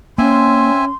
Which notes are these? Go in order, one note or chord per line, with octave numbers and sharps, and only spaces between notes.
A#3 C4 C#4 E5 G#5 C6